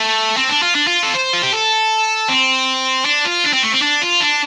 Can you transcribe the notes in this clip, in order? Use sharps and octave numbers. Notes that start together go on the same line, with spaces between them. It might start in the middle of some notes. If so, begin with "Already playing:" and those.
Already playing: A3
C4
D4
F4
D4
F4
A4
C5
F4
G4
A4
C4
D4
F4
D4
C4
A3
C4
D4
F4
D4